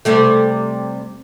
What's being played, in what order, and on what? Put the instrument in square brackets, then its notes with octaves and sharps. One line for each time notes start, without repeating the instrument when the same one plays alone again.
[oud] C3 G3 A3